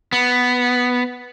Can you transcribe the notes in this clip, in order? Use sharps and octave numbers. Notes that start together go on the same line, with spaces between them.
B3